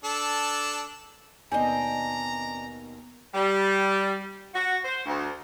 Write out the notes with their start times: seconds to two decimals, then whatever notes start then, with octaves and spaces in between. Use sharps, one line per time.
0.04 D4 A4
1.52 D#2 B2 C4 D4 D#5 G#5 A#5
3.34 G3
4.54 F#4
4.84 C5
5.06 D2